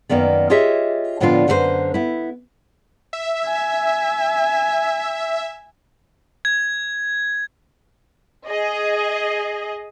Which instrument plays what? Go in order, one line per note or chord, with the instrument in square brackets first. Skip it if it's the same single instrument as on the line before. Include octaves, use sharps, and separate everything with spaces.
[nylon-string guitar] F#2 D#3 A#3 B3 D5
F4 G4 G#4 C#5 D#5 E5
A2 D3 F3 B3 D4 F4
F#2 D3 A#3 F#4 B4 C5
B3 E4
[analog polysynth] E5
[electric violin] G#5
[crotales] G#6
[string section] G#4 D#5